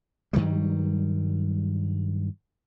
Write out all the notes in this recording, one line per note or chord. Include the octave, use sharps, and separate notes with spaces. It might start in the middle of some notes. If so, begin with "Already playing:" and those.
G2 D#3 F#3 G3